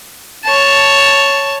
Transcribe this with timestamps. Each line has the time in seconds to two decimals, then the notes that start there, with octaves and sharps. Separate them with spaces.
0.45 C#5 A5